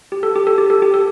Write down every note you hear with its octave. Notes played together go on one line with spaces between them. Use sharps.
G4
A4
G4
A4
G4
A4
G4
A4